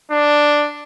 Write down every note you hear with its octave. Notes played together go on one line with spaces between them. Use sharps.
D4